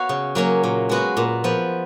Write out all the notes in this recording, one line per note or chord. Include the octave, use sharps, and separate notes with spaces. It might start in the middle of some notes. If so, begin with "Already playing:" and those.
Already playing: B3 F#4 C#5 F5
C#3
F#3 A#3 C#4
A#2
G#3 B3 F#4
A#2
F3 B3